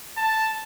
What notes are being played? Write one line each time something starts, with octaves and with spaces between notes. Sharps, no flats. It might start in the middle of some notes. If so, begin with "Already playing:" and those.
A5